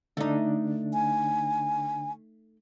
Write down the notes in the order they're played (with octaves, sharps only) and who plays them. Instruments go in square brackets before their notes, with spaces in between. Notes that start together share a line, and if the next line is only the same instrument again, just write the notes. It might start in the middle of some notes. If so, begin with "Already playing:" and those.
[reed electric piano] D3 D4 [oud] A3 D#4
[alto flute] G#5